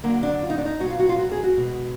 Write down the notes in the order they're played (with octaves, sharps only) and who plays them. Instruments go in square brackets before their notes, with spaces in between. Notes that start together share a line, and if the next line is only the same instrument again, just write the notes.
[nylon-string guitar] D3 F#3 A#3
D4
F4
D#4
D4
D#4
B2 F#3 F#4
F4
F#4
F4
F#4
G#4
F#4
B2 G#3